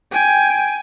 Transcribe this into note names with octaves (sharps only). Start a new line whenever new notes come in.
G5 G#5